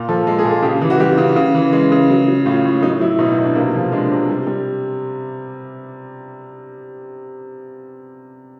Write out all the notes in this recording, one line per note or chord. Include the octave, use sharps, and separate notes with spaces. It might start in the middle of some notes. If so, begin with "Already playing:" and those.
Already playing: A#2
F3 A4
G#3 A4
G#4
A#2
A4
C#3 G4
E3
F#4
G3 G4
C#3
C#3
E3
G#3
C#3
F#3
F#3
A2 F4
A2
F#3 D#4
F#3 E4
B2 D#4
D#4
B2
D4
C3 A#3
F3
G#3 D4
C3
G3
G3